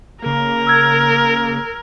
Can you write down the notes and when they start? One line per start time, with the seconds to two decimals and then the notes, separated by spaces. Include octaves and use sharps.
0.22 C#3 A#3 A#4
0.67 E6 F6 G#6